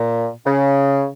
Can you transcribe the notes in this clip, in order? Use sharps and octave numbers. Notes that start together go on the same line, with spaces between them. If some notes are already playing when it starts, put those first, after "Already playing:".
Already playing: A#2
C#3